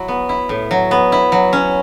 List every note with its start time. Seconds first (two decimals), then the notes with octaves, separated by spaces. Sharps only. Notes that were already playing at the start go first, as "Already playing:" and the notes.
Already playing: F#3 E4
0.08 B3
0.29 E4
0.49 A2
0.71 F#3
0.91 B3
1.12 E4
1.32 F#3
1.53 C#4